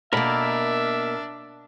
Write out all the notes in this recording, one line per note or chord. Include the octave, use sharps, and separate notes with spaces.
B2 A#3 D4 A#4 E5 B5